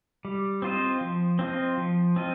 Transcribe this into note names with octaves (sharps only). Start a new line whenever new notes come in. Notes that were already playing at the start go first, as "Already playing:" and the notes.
G3
C4 F4 C5 D#5
F3
C4 F4 D#5
F3
C4 F4 D#5